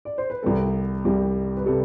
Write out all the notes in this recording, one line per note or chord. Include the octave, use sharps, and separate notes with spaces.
D5
C5
B4
C2 C3 G3 A4
C2 C3 G3
B4
C3 G3 A4